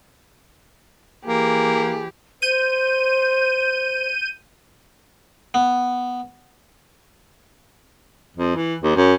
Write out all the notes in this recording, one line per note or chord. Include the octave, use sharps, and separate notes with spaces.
E3 A#3 G4 G#4
C5 G6 D#7
B3
F2
E3
D#2
F#2